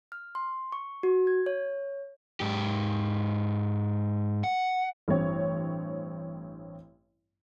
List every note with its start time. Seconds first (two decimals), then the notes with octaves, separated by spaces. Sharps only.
0.12 F6
0.35 C6
0.72 C#6
1.03 F#4
1.27 G#6
1.46 C#5
2.40 G#2 G4
4.44 F#5
5.08 A1 G2 C4 C#5